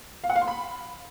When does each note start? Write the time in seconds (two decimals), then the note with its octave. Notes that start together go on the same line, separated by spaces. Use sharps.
0.24 F5
0.30 F#5
0.36 F5
0.42 C6
0.48 B5